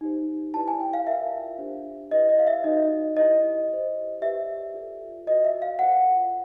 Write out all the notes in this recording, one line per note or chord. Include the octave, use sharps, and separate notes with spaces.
D#4 G4 C5
E4 G4 B4 D5 A5
G#5
G5
F5
F4 A#4 D5 E5
D4 G4 C5
E4 G4 B4 D#5
D#5
F5
E5
D#4 F#4 B4 D5 D#5
E4 G4 B4 D5 D#5
G4 C5
G4 B4 D5 E5
F4 A4 D5
F#4 B4 D5 D#5
E5
F5
F4 A4 C5 F#5